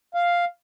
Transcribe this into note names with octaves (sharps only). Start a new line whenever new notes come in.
F5